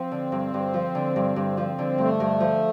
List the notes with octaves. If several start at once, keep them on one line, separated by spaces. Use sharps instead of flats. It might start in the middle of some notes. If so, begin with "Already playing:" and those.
Already playing: F3 C4
D3
G2
G2
F3
D3
G2
G2
F3
D3
G2 A3
G2
F3